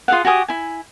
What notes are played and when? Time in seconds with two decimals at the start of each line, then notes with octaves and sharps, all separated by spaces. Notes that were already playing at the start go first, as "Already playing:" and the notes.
0.08 F4 G#4 F5 F#5
0.25 F#4 G4 G#5 D#6
0.48 E4 G#5